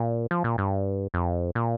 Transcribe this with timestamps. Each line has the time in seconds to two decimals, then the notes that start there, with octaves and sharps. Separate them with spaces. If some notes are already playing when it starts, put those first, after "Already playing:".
Already playing: A#2
0.31 F3
0.44 A#2
0.58 G2
1.14 F2
1.55 A#2